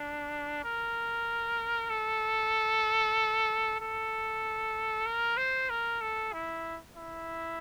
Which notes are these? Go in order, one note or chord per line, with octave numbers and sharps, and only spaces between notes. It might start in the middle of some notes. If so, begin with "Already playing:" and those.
Already playing: D4
A#4
A4
A4
A#4
C5
A#4
A4
E4
E4